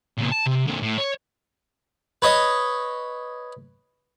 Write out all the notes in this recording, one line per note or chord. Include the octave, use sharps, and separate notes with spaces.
C#2 A#2
A5
C3
A#2 D3
A2
C#5
B4 C#5 D#5